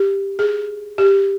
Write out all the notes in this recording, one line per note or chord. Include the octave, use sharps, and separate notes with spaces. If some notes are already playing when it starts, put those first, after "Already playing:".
Already playing: G4
G#4
G4